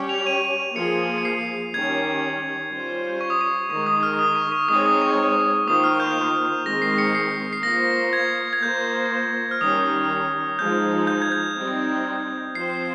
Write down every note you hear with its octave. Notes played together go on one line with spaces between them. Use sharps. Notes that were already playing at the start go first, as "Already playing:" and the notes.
Already playing: G3 C#4 G4 C#5
F7
D#7
F3 A#3 F4 G#4 C#7
C#7
C7
D#3 G3 C#4 G4 G#6
G3 C#4 F4 C5
C#6
D#6
C#6
D#3 G#3 D#4 C#6
D#6
F6
D#6
C#6
C#6
G#3 C4 D#4 G#4 C#5 D#6
D#6
C#6
D#3 A#3 F4 C5 D#6
F6
G6
D#3 G#3 C4 A#6
C7
C#7
C7
C7
A#3 F4 C5 A#6
G#6
G#6
A#3 F4 C5 G6
F6
D#3 G3 C#4 D#6
F3 G#3 D#4 G6
G6
G#6
G6
G3 C4 D#4
F3 C4 F4 C5 C7